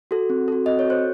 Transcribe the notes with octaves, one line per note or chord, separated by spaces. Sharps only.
F#4 A4
C4
F#4 A4
C4 D#5
C#5
F#4 A4 C5